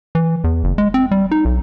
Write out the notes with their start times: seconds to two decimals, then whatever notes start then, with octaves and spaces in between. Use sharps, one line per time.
0.15 E3
0.44 E2
0.64 F#1
0.78 G#3
0.94 C4
1.11 G3
1.31 D#4
1.45 B1